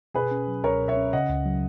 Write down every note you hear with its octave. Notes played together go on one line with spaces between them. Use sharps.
B2 G#4 B4
C#4
F#3
C#2 A#4 C#5
B2
C#5 E5
C#4
C#3 D#5 F#5
C#2
F#3